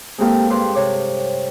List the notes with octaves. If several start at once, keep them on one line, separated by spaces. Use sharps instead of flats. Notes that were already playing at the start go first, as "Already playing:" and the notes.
G#3 A#3 C4 G4 A4 F5
G2 G4 B4 C6 F6
C3 C#5 D6